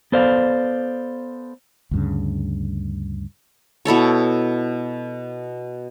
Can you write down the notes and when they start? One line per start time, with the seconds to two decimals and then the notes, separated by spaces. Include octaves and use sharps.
0.12 B3 A4 C5 D5 F5
1.91 D2 G2 C#3
3.85 B2 E4 A4 C#5